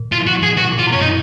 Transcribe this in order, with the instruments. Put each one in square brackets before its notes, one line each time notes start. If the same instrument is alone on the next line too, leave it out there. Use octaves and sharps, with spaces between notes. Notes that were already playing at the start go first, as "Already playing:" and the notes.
Already playing: [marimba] A#2
[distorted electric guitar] F4
F#4
G#4
[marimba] B2 [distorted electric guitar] F#4
[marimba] A#2
[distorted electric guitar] F4
[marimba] F#2
[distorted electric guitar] C#4
D#4